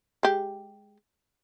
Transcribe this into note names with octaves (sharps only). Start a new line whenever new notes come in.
G#3 G4